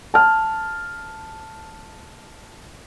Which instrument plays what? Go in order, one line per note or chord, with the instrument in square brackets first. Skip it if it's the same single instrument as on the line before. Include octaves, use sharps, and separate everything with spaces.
[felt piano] A5 F6